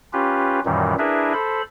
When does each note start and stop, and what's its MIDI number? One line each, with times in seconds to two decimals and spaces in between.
0.13 0.60 61
0.13 0.60 65
0.13 0.60 67
0.13 0.60 71
0.65 0.94 42
0.65 0.94 46
0.65 0.94 51
0.65 0.94 52
0.65 0.94 55
0.99 1.33 62
0.99 1.33 64
0.99 1.33 68
0.99 1.33 70
0.99 1.33 71
0.99 1.33 76
1.34 1.62 69
1.34 1.62 72
1.34 1.62 83